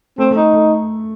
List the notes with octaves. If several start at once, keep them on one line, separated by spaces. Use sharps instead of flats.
A3 C4
A3
D#4
A3